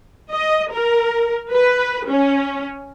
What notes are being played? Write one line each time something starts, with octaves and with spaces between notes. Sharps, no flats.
D#5
A#4
B4
C#4